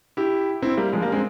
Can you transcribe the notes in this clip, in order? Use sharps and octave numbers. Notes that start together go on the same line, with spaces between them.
E4 G4
C4 E4
G3 A#3
F3 G#3
G3 A#3
G#3 C4